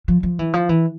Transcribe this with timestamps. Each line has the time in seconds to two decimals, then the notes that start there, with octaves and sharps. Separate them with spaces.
0.08 F3
0.23 F3
0.39 E3
0.53 F3
0.69 E3